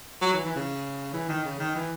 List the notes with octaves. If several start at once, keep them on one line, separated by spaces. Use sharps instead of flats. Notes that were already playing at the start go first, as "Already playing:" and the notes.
F#3
E3
E3
C#3
E3
D#3
C#3
D#3
E3